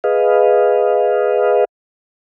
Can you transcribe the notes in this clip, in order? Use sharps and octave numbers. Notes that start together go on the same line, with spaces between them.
G#4 B4 D#5 F5